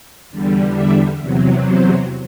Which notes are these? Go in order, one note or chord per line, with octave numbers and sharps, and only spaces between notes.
E2 D3 G3
E5
E2 C3 F#3
C5